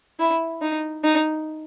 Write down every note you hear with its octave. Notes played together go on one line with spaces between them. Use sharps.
E4
D#4
D#4